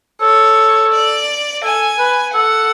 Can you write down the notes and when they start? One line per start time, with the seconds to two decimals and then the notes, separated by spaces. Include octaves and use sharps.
0.21 A4 C#5
0.93 D5
1.64 A4 G#5
1.99 B4
2.35 A4 F#5